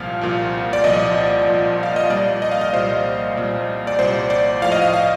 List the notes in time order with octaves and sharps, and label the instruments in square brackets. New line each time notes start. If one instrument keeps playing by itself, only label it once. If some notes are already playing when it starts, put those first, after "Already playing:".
Already playing: [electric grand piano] C2 A#2 F3 F5
C2 A#2 F3
D5
C2 A#2 F3 D#5
C2 A#2 F3
F5
D#5
C2 A#2 G3 D5
D#5
F5
D#5
C2 A#2 G3 C5
C2 A#2 G3
D5
C2 A#2 G3 C5
D5
A2 F3 F5
D#5
F5
F5